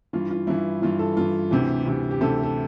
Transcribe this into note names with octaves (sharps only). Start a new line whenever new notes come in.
G2 E3 F4
F4
G2 E3 E4
G2 E3 F4
A4
G2 E3 F4
D2 C3 E3 G4
D2 C3 E3
G4
D2 C3 E3 A4
A4